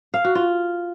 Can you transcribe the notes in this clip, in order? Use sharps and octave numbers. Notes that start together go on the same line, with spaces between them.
F5
F#4
F4